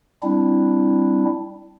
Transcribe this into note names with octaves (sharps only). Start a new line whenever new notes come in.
G3 C4 D4 E4